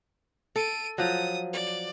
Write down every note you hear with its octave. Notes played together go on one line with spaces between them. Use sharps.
A4 D7 D#7
F3 F#3 D#6
D5